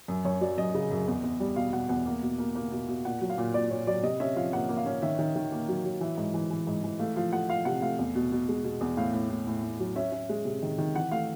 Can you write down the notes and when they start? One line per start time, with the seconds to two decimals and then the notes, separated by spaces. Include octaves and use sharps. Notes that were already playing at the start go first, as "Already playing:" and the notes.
0.08 F#2
0.25 F#2 C#5
0.41 F#3 D5
0.58 F#2 D#5
0.74 C#3
0.91 F#2
1.07 E2
1.23 E2
1.40 G3
1.56 B2 F5
1.73 B2 F#5
1.89 E2 F#5
2.06 A#3
2.22 B2
2.38 A#3
2.55 A#3
2.72 B2
2.88 B2
3.05 A#2 F#5
3.21 F#3
3.30 F5
3.38 A#2
3.54 A#2 D5
3.71 A#2 C#5
3.87 F#3 D5
4.03 C3 D#5
4.20 C#4 E5
4.36 F3 F5
4.53 A#3 F#5
4.69 A#3
4.77 F5
4.86 C#4
5.02 D#3 E5
5.19 D#3
5.36 D#3
5.52 A#3
5.68 F#3
5.84 F#3
6.01 E3 E5
6.17 G#2
6.34 E3
6.50 E3
6.67 G#2
6.83 E3
6.99 A3 F5
7.16 F3 F5
7.33 A3 F#5
7.49 F3 F5
7.65 C3 F#5
7.82 A3 F5
7.99 E2
8.15 B2
8.32 B2
8.49 G#3
8.64 B2
8.81 E2
8.97 A2 F5
9.13 A2
9.30 A2
9.47 A2
9.64 A2
9.80 F#3
9.96 C#4 E5
10.12 C#4
10.29 G#3
10.45 C3
10.62 D#3
10.78 D#3
10.95 E3 F#5
11.12 A3 F5